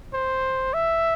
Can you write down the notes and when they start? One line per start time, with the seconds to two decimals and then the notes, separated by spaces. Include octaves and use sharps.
0.14 C5
0.74 E5